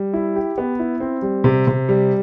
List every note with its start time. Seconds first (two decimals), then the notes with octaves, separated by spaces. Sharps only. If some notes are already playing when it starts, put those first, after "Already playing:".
Already playing: G3
0.13 E4
0.36 G4
0.58 B3
0.79 E4
1.00 C4
1.22 G3
1.44 C3
1.67 C3
1.89 G3